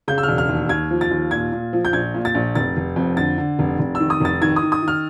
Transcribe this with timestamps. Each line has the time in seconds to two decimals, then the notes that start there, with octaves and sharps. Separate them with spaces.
0.08 C#3 G6
0.18 E6
0.23 E1 F6
0.38 F6
0.49 D#2
0.69 D#2 G#6
0.91 F3
1.01 A6
1.11 D#2
1.31 A#2 G#6
1.52 A#2
1.73 F3
1.85 G6
1.93 A#1 G#6
2.14 A#2
2.25 A6
2.35 A#1
2.55 F1 A6
2.77 F1
2.96 F2
3.17 D3 A6
3.38 D3
3.59 F1
3.79 F1
3.95 D#3 E6
4.10 D#6
4.20 F1 A6
4.42 D#3 G#6
4.56 D#6
4.62 D#3
4.72 D#6
4.83 D#3
4.88 F6